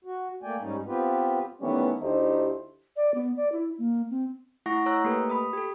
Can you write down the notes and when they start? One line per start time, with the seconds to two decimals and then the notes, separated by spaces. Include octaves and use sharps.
0.05 F#4
0.43 A3 A#3 D5 G5 G#5
0.61 G#2 G3 C#4 D#4
0.86 B3 C4 F4 G4 B4
1.61 D#3 E3 G3 A3 B3 C#4
2.02 D2 A3 D#4 E4 G4 C5
2.97 D5
3.15 B3
3.37 D5
3.52 E4
3.78 A#3
4.10 C4
4.66 A3 E4 F#5 C#6 A#6
4.86 C#5 A#5 E6 F#6
5.04 A3 A#3 G4 A4 B4
5.30 B5 D#6
5.53 G4 A4